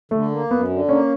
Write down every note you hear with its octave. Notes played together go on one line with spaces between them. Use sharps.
D3 A3
A#3
F#2 B3
D3
A#3 C#4